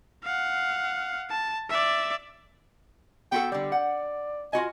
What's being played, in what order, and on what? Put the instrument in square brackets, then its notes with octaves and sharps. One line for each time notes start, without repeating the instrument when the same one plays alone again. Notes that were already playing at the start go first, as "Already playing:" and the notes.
[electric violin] F5 F#5
A5
D5 E5
[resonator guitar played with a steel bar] B3 F#4 A4 [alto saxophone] G5
[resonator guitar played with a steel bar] D3 G3 [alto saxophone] D5
[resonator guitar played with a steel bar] F#5
[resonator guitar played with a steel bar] F4 F#4 D#5 [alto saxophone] G#5